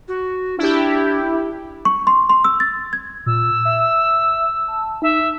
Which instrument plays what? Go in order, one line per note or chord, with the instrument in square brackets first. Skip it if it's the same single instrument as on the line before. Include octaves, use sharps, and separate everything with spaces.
[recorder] F#4
[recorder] D4 [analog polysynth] E4 G4
[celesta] C#6
C6
C6
E6
A6
G#6
[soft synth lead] A#2 [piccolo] E6
[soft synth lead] E5
A5
[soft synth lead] D#4 [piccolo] E5